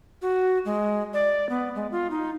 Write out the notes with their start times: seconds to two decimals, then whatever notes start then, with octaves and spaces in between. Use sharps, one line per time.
0.22 F#4
0.65 G#3
1.14 D5
1.49 B3
1.75 G#3
1.92 F4
2.11 D#4